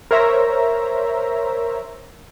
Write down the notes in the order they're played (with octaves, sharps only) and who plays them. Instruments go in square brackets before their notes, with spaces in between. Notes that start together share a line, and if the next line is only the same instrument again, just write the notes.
[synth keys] A#4 C5 C#5 E5 A#5